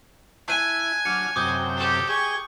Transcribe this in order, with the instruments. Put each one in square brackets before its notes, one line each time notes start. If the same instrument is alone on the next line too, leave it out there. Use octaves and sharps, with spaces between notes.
[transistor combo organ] E4 [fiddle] G#5 [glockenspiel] A5 F#6 D#7
[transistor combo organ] F#3 D4 F6 [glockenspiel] C#7
[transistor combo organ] F#2 C3 G5 [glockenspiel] D6 D#6 G6
[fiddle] G4 A4
[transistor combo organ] G#4 G5 [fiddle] C#6